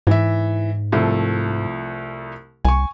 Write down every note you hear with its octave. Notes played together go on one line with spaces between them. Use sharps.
G#2 E3 E5
C2 F3 A3
C2 G#5 C#6